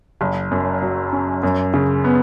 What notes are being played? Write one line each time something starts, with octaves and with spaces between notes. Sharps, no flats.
F#1
F#2
F#3
C#4
F#2
C#3
B3